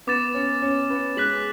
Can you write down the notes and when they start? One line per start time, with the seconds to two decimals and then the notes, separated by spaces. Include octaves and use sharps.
0.07 B3 D6 A6 E7
0.34 C#4
0.62 C#4
0.90 B3
1.17 G#3 F#6 B6 F#7